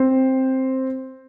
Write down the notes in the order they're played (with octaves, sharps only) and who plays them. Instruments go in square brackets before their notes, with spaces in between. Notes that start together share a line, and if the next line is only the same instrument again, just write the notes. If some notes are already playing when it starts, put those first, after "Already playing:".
Already playing: [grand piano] C4 C5